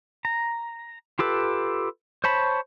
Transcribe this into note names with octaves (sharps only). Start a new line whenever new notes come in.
A#5
F4 G4 A4 B4
C5 C#5 A5 B5